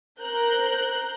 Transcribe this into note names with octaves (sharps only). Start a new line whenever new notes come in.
A#4 C5 A#5 F#6 G6